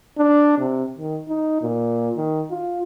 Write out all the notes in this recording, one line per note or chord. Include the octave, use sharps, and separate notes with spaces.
D4
C3
D#3
D#4
A#2
D#3
F4